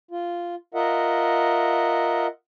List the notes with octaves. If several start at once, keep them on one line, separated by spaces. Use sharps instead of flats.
F4
F4 A#4 D#5 E5 F#5